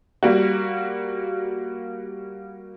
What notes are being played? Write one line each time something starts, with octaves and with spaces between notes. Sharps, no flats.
G3 A#3 F#4